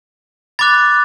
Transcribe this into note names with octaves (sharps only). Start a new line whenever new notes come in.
B5 D6 F#6 A6